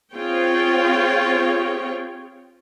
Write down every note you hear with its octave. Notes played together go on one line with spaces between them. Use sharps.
C4 F4 G#4 C#5 G5